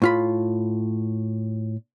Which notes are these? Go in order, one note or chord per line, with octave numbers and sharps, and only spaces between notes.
A2 F4 B5